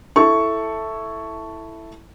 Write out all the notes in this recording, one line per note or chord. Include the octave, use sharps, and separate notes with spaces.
E4 A4 A5 C#6